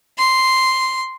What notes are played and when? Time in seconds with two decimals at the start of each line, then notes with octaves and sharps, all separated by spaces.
0.18 C6